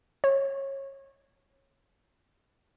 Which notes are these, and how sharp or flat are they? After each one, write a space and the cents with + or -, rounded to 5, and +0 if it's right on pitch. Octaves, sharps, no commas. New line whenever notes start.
C#5 -25